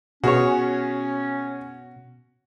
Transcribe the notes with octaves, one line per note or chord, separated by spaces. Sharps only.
B2 C#4 F#4 G#4 C#5